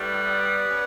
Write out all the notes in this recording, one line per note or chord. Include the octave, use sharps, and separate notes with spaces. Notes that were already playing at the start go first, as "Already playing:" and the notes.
Already playing: A2 G3 B4 D5
B3
C#4